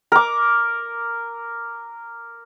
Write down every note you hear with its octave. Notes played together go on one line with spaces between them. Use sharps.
A#4 D6